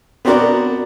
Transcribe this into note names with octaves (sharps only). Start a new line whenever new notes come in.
B3 C4 D4 F#4 A#4 D5